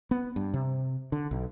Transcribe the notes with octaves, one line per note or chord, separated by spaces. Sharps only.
B3
G2
C3
D3
B1